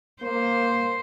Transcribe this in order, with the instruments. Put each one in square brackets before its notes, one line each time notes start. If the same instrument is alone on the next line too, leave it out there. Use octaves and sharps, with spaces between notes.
[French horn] A#3 [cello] C5